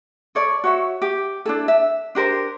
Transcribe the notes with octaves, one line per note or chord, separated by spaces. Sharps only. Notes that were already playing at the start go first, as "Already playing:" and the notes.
A4 C#5 D5
F#4 C#5 E5
G4
D4 E4 A4
E5
D4 G4 A#4 C5